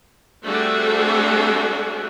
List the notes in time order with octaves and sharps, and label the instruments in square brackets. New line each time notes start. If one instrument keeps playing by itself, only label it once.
[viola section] G3 A3 C4 D4 F#4 G#4